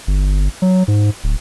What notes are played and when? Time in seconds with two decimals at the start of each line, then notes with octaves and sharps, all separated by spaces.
0.07 G1
0.62 F#3
0.88 G#2
1.24 D1